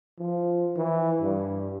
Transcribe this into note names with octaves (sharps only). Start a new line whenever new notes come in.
F3
E3
G2